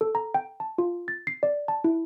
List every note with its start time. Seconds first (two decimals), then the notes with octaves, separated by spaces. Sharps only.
0.01 A4
0.15 A#5
0.35 G5
0.60 A5
0.78 F4
1.08 A6
1.27 C7
1.43 D5
1.68 A5
1.84 E4